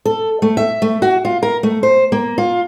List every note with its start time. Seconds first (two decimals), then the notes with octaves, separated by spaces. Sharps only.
0.05 A4
0.42 A3
0.57 E5
0.82 A3
1.02 F#4
1.25 F4
1.43 A#4
1.63 A3
1.83 C5
2.12 A#3
2.38 F4